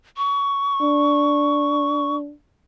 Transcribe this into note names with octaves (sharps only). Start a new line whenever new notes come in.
C#6
D4